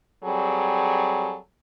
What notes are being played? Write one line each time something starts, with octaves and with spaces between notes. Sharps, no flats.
F#3 G3 C4 G#4 A4